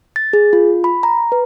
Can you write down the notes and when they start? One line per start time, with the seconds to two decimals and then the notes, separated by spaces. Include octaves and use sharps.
0.16 A6
0.33 G#4
0.53 F4
0.84 B5
1.03 A#5
1.32 B4